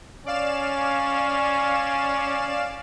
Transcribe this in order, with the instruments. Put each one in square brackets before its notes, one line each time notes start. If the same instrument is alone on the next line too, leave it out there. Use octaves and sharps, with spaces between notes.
[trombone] C#4 [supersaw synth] D5 F5 E7